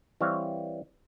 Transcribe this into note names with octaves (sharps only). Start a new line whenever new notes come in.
E3 G3 C4 C#5 F5